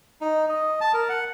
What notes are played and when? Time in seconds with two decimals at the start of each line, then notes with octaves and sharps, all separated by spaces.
0.21 D#4
0.49 D#5
0.81 A5
0.94 A#4
1.09 F#5